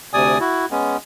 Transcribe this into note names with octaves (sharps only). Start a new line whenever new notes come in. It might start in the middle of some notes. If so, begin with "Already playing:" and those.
D2 C3 D5 G#5 D#6
E4 F#4
G#3 B3 C#4